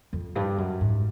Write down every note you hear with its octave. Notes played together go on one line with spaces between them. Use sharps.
F2
G2
F#2
G#2